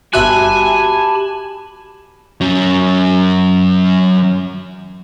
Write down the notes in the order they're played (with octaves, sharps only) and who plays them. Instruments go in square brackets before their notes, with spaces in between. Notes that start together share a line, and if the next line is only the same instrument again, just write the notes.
[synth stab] G1 E5 F#6 [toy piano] F#4 [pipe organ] G4 A5 B5 [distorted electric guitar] G#5
[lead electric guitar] F#3 C#4